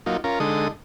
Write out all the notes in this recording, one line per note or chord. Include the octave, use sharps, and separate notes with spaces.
F#3 A#3 D#4 F4
C#4 F4 A#4
D3 G#3 D#4 A4 D#6